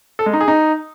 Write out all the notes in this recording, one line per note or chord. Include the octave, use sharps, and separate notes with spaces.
A4
G#3
D#4
G#4
D#4